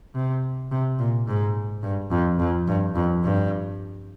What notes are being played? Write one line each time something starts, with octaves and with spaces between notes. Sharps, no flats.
C3
C3
A#2
G#2
G2
F2
F2
G2
F2
G2